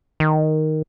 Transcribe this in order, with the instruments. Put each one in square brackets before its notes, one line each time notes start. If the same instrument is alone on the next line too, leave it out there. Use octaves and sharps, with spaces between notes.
[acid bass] D#3